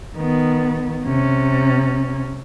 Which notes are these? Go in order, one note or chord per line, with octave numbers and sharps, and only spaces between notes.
D#3 B3
C3 C#4